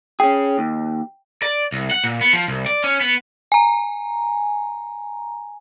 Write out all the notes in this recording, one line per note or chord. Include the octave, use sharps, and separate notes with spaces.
C#4 G#4 G5
D#2
D5
C2
F#5
A#2
B3
F3
C2
D5
C#4
B3
G#5 A#5